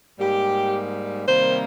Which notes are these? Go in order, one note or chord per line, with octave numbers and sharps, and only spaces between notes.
G#2 G3 A#3 G4
C3 D#3 G3 A#3 C5